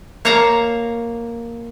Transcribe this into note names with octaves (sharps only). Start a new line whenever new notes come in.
A#3 C#5 F5 A5 A#5